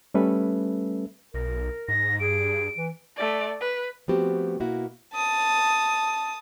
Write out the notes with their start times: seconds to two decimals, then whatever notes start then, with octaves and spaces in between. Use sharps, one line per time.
0.14 G3 A3 C#4 A4 B4 E5
1.34 B1 A#4
1.88 G#2 A#6
2.20 G2 G#4 D7
2.77 E3
3.16 A3 D5
3.61 B4
4.08 F3 A3 B3 C4 F#4 G4
4.60 B2 A#3 E4 F#4
5.13 A5 D#6